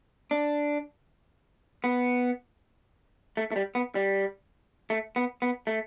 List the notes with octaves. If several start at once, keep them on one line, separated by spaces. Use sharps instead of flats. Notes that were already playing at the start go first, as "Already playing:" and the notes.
D4
B3
A3
A3
G3
B3
G3
A3
B3
B3
A3